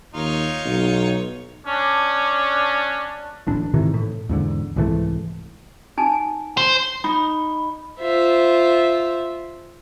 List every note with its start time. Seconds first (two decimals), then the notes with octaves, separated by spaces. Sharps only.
0.14 D#2 D#4 F4 C#5
0.65 B1
1.67 C#4 D4
3.47 D1 A1 D4
3.74 G#2 C3 D#3 E3
3.94 A2
4.29 E2 G#2 D3
4.76 C2 G#2 E3 A3
5.98 D#4 G#5 A5
6.57 C5
7.04 D#4 B5
8.00 F4 C5 E5